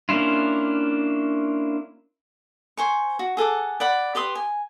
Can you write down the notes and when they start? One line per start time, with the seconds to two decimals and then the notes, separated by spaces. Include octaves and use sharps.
0.09 A#3 C#4 D4 E4 F4
2.77 C5 G#5 C#6
3.19 F#4
3.37 G#4 A4 F#5 D6
3.80 D5 F#5 B5
4.15 G4 B4 C6 D#6
4.35 G#5